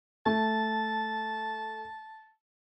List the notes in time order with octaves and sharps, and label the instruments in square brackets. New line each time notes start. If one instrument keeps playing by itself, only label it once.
[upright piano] A3 [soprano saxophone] A5